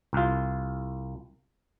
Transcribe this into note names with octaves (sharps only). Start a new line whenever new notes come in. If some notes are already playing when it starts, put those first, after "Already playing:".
C2 F4